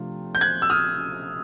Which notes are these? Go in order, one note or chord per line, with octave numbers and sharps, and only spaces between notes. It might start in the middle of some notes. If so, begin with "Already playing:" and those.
Already playing: C3 F3 A3 D4 F4
G6
F#6 G#6
E6
D#6 F6